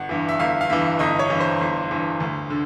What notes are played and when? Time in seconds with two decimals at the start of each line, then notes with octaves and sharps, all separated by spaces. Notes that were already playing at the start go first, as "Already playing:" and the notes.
Already playing: G1 F#5
0.09 G2 E3
0.29 E5
0.40 G1 F5
0.61 F5
0.70 G2 E3 E5
0.99 G1 D#5
1.19 C#5
1.30 G2 E3
1.40 C5
1.61 G1
1.91 G2 E3
2.20 D2
2.50 D3